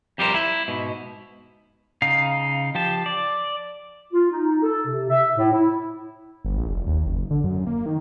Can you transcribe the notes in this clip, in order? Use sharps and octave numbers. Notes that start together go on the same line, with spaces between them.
F2 G3 G4 G#4 A#4 C5
E4
G#2 B2
C#3 D#4 F5
F3 G4 A5
D5
F4
D#4
A4
C3
E5
A2
E4
G1
A#1
F1
D#2
F#1
D3
F#2
A#3
D#3